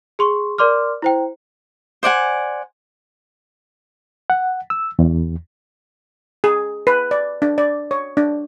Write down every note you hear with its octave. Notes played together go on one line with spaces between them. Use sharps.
G#4 C6 C#6
A#4 D5 C6 D6 F6
E4 C5 G5
C5 D5 F#5 G#5
F#5
E6
E2
G#4
B4
D5
D4
D5
C#5
D4